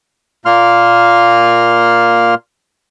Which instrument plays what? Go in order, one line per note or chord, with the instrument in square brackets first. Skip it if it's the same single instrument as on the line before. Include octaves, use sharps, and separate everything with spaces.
[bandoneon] A#2 A#3 C6 F6